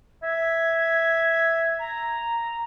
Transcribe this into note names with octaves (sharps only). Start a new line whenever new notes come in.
E5 G#6
A#5